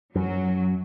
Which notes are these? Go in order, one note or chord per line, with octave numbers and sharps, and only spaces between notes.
F#2 F#3